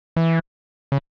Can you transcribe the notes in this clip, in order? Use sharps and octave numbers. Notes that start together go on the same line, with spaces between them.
E3
C#3